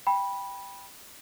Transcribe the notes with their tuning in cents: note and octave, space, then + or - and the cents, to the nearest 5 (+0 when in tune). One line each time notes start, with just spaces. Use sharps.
G5 +10 B5 -10